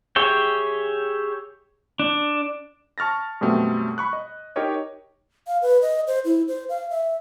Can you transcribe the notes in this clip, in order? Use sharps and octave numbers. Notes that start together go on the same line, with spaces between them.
G4 G#4 C#5 E5 G5
D4
A5 C#6 F6 A6 A#6
F#2 B2 G3 A3 C4
B5 C#6 F#6
D#5
D#4 G4 A#4 C#5 D#5
F5
B4
D#5
C5
E4
C5
F5
E5